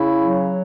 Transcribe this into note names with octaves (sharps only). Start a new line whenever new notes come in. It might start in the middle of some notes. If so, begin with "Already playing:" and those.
Already playing: C#3 E4
F#3